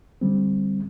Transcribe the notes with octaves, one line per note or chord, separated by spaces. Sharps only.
D3 G3 C4